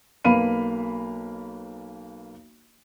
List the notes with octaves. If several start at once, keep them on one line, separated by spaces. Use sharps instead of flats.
B1 A#3 B4 F5 B5 D#7